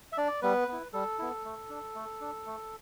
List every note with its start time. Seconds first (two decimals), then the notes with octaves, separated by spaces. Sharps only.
0.12 E5
0.18 D4 D5
0.42 G3 B3 B4
0.68 B3 E4
0.93 G3 A4
1.19 B3 E4
1.45 A3
1.69 D4
1.95 A3
2.21 D4
2.46 A3